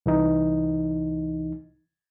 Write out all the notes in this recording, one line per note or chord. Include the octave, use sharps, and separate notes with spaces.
C2 E3 D#4